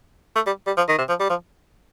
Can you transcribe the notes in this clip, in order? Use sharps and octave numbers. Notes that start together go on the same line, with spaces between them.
A3
G3
G3
F3
D#3
C3
F3
G3
F3